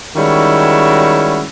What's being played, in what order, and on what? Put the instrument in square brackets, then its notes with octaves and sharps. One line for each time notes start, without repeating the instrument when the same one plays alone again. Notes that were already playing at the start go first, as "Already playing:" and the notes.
[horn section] D#3 G3 G#3 C#4 E4 F#4